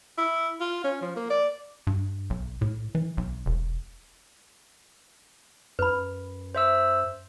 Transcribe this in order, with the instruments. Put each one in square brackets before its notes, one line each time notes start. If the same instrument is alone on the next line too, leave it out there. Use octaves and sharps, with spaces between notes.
[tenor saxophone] E4
F4
C#4
F3
A#3
D5
[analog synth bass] G2
B1
A2
E3
B1
E1
[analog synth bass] F#2 [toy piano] B4 B5
[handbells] C5 E5 E6